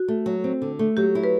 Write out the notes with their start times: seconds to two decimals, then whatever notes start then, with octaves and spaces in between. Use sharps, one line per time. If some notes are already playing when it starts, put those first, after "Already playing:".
Already playing: F#4
0.08 A3
0.26 F#3
0.44 C4
0.62 D3
0.79 A3
0.97 F#3 G4
1.15 E4
1.24 B4